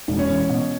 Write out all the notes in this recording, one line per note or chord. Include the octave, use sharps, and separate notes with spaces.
E1
C#4
E2
B2